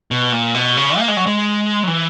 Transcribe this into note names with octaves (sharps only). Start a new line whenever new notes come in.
B2
A#2
B2
C#3
A#3
G#3
F#3
G#3
F#3
E3